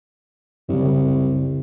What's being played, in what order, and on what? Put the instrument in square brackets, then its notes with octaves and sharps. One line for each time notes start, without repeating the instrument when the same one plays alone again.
[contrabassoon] C2 [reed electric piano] F#2 C#3